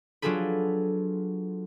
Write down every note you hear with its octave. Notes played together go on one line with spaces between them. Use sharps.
F#3 D4 F4 G#4 A4 B4